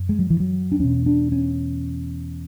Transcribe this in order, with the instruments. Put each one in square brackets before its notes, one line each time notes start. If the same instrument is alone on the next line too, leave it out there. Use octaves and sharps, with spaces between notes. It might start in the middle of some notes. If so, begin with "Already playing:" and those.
Already playing: [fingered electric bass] F#2
G#3
F#3
E3
F#3
D4
E2 B2 C#4
D4
C#4